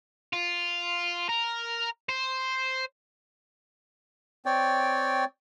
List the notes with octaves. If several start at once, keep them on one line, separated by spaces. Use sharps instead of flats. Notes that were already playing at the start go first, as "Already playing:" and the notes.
F4
A#4
C5
C4 C#5 D5 G5